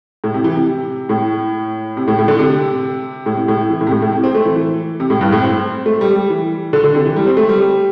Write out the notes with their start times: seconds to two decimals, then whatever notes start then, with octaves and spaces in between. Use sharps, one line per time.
0.24 A2
0.34 C3
0.44 E3
0.56 C3
1.09 A2
1.97 C3
2.08 A2
2.18 A2
2.28 D3
2.39 C3
3.26 A2
3.36 C3
3.48 A2
3.70 E3
3.81 A2
3.87 C3
3.91 A2
4.02 A2
4.13 C3
4.24 C4
4.35 A3
4.45 E3
4.56 E3
5.00 C3
5.10 A2
5.21 G2
5.32 A2
5.42 C4
5.86 A3
6.01 G3
6.15 G3
6.30 E3
6.73 D3
6.84 D3
6.95 C3
7.06 E3
7.16 G3
7.27 C4
7.37 A3
7.49 G3